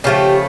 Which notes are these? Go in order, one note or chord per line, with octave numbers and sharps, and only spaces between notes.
C#3 F3 A3 G4